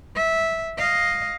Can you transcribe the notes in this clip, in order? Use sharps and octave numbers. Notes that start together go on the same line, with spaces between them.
E5
D#5 F5